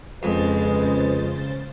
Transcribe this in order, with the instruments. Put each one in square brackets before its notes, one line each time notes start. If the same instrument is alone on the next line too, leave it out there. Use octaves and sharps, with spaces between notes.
[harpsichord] F2 [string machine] C#3 C5 A6 [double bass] G#3 [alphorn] B4